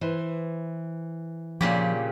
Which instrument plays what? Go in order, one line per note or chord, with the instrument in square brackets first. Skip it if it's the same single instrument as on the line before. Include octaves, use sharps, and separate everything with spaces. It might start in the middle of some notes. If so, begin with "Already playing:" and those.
[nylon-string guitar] E3 C5
[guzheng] A#2 C#3 G4 [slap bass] F3